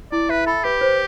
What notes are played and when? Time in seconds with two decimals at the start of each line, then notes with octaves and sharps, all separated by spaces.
0.12 E4 D5
0.29 B4 E5
0.47 A4 B5
0.64 G4 B4
0.81 C5